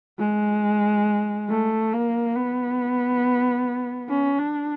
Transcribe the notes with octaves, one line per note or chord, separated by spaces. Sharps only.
G#3
A3
A#3
B3
C#4
D4